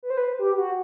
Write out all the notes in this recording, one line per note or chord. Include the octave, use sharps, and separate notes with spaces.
B4
C5
B4
G4
F#4